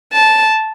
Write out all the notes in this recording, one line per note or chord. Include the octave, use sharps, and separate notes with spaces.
A5